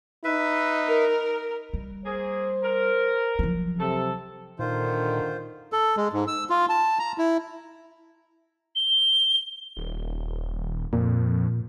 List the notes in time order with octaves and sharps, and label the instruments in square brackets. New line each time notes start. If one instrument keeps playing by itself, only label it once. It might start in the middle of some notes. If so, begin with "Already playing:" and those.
[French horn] D#4 [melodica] B4 E5
[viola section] A#4
[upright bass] G3
[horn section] A#3 G#4 [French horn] C5
[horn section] A#4
[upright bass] F3 F#3
[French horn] C3 [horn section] A4
[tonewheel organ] A#2 [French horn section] D3 D#3 [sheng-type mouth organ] F4 C5
[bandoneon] A4
G#3
G#2
E6
F4
A5
A#5
E4
[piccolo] G7
[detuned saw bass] D#1
[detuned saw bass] F2 [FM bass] A#2